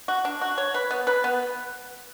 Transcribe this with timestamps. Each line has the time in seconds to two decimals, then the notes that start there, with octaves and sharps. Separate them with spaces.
0.08 F#4
0.25 D4
0.41 F#4
0.58 C#5
0.74 B4
0.91 B3
1.07 B4
1.24 B3